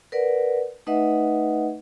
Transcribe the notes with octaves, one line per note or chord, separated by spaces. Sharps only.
A#4 B4 D5 F#5
A3 D#4 B4 D#5 E5 F#5